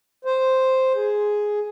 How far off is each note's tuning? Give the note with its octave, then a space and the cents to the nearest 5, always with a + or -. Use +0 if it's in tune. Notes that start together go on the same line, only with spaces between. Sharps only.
C5 +0
G#4 +5